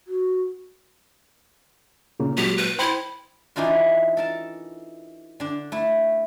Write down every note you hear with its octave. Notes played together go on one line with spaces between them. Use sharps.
F#4
A#2 C#3 A#3
A#2 F#3 G#3 G4
B4
E4 C5 G5 B5
E3 D4 D#4 F4 F#4
A4 A#4 A5
D3 D4
A3 E4